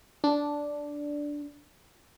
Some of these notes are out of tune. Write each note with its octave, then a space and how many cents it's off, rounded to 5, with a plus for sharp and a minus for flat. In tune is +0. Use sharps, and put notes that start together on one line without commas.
D4 -5